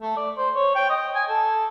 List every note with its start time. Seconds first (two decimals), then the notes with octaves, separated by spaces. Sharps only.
0.01 A3
0.16 D5
0.37 C5
0.55 C#5
0.75 G5
0.89 D#5
1.15 G#5
1.28 A4